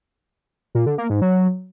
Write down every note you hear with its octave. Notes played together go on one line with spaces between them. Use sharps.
A#2
D3
A#3
G#2
F#3